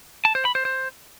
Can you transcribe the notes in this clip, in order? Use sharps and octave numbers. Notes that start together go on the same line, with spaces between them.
A5
C5
B5
C5
C5